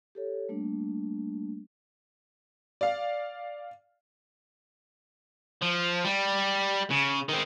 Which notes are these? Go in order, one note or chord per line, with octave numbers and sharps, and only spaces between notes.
G4 A4 C#5
G3 A3 A#3 D4
D5 F5
F3
G3
C#3
D#3 C4